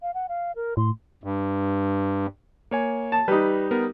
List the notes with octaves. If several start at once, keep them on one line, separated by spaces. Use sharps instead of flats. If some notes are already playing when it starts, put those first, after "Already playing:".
F5
F#5
F5
A#4
A2 C6
G2
A#3 C#5 G#5
A5
G3 D#4 B4
B3 A#4